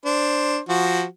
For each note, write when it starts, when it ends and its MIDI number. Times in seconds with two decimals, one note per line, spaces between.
0.05 0.59 62
0.05 0.59 72
0.69 1.04 53
0.69 1.04 66